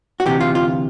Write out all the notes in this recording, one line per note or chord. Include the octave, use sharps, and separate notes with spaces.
F#4
D2 C3 E3 G4
F4
F4